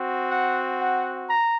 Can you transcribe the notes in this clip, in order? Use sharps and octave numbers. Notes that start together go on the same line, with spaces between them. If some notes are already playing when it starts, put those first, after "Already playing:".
Already playing: C4 F#4
F#5
F#5
A#5